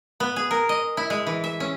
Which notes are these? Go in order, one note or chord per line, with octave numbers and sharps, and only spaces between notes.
B3
G#4
A#4
D#5
E4
G#3
E3
E5
C#4